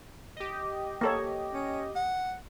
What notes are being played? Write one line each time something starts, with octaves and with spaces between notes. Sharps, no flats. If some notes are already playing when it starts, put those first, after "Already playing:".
G4 D#5
A#3 A4 C#5
C#4
F#5